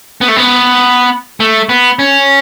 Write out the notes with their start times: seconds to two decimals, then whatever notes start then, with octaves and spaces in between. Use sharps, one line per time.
0.21 B3
0.28 A3
0.36 B3
1.40 A3
1.69 B3
1.99 C#4